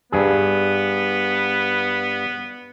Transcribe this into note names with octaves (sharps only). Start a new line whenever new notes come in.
G2 B3 G#4